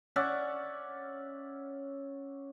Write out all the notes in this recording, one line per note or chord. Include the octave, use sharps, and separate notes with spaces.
C#4 D5 E5 F#5